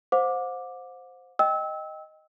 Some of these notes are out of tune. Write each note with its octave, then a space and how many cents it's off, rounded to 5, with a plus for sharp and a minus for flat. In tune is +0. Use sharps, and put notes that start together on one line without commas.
C5 +0 F#5 -45 D6 +0
D#5 +0 G5 +0 E6 -25